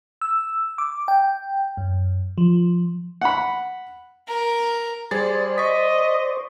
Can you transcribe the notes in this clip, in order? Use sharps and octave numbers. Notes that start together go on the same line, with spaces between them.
E6
D6
G5
F#2
F3
F#5 B5
A#4
G3 G#4 C5 D5 A6
D#5 C#6 B6